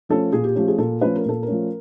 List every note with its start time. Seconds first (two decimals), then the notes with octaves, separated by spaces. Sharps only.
0.09 F3 A3 C#4 A4
0.33 A#2 G#4
0.44 G4
0.55 F3 A3 C#4 G4
0.68 G#4
0.78 A#2 A4
1.01 F3 A3 C#4 B4
1.15 A#4
1.25 A#2 A4
1.43 A#4
1.48 F3 A3 C#4